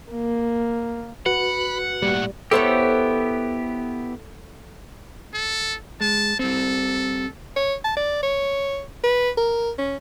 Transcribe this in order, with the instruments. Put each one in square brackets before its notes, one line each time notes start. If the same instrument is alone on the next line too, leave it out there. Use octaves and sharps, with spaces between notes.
[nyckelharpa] A#3
[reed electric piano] F#4 B4 [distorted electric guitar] F#5 [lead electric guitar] B5
[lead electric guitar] A2 A#3 [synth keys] G3
[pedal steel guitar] B3 E4 G4 [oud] A4 C5 C#5
[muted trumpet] A4
[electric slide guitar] G#3 [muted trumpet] A5
[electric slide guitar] G3 C4 [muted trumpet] A4
[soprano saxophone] C#5
A5
D5
C#5
B4
A#4
C#4